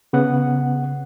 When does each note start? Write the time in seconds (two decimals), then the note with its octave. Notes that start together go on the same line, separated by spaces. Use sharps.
0.13 C#3 B3 F#5